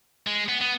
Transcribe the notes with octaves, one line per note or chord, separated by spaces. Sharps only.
G#3
B3
B3